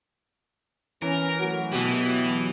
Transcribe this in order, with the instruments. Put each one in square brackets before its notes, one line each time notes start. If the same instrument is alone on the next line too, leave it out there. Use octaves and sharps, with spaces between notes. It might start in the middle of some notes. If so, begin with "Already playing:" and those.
[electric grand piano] E3 [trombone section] B3 C#4 [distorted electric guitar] A#4
[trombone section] F#3 A3 F#4
[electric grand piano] B2 G4 [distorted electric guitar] E3
[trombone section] F#3 B3